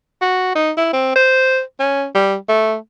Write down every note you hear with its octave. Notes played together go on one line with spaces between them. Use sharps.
F#4
D#4
E4
C4
C5
C#4
G3
A3